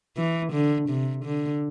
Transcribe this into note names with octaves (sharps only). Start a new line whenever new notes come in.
E3
D3
C3
D3